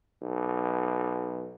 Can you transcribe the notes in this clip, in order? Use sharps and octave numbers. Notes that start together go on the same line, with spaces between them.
B1